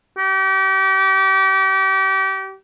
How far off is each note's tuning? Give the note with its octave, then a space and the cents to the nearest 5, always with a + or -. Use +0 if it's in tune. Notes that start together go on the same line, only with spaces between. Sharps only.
G4 -35